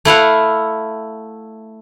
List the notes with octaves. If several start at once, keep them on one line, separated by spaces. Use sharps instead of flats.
A3 E4 F5 F#5